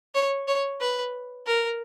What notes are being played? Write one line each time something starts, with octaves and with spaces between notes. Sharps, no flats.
C#5
C#5
B4
A#4